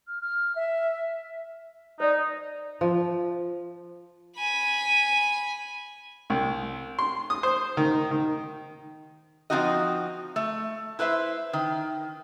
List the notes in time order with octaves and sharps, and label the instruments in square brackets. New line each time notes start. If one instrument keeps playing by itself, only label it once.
[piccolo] F6
F6
E5
[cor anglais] D#4 [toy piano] C5 D5
[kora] F3
[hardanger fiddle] G#5 B5
[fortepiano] C2
C6
D#6
C5
D#3
D#3
[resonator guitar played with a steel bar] F3 G#3 C4 D#4 F#4 D#5
A3
E4 B4 C5 E5
D#3